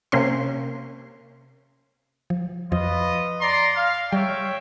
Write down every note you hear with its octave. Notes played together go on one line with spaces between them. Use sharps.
C3 A#3 C#4 C6
F3
F2 F3 F4 B4 D#5
D5 A#5 C6
F5
G3 C#5 E5 G5